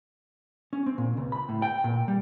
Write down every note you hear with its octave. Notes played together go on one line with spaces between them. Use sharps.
C#4
C4
A#2
C#2
B5
A2
G5
A#2
G3